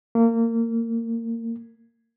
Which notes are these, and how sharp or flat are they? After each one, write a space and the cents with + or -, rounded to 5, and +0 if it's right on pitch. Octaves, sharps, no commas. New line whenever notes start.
A#3 -25